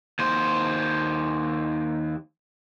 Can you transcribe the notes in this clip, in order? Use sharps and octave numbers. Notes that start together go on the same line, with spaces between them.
D#2 C5